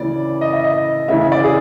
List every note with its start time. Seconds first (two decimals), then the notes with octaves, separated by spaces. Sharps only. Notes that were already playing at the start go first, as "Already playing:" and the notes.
Already playing: D2 C#3 E3 D5
0.41 D#5
0.53 E5
0.64 D#5
1.08 D2 C#3 E3 E5
1.32 D5
1.44 G#4